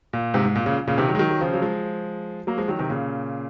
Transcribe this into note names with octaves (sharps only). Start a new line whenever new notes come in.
A#2
G#2 C3
G#2
A#2
A#2 C#3
A#2 C#3
C3 D#3
D#3 F#3
G#3
D#3 F#3
F#3
C#3 F3
F#3
F3 G#3
F#3 A#3
F3 G#3
D#3 F#3
C3 D#3
A#2 C#3